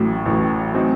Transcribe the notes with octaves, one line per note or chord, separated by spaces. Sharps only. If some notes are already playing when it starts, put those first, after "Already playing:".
Already playing: A1 A2 F#3
A1 A2 F#3
F#3 C4 D#4